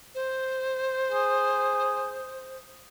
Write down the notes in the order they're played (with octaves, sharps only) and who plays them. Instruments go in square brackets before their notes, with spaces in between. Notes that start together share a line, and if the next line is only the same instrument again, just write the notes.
[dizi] C5
[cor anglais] G#4